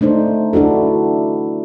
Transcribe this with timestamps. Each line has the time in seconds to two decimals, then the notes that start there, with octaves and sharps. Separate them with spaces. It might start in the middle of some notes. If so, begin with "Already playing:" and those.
0.01 A3 D4 D#4 C5
0.53 D4 E4 F#4 A4